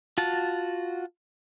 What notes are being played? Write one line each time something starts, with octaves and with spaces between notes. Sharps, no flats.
F4 F#4 A5